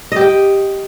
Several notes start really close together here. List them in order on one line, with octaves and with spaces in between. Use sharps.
D#5 G4 G5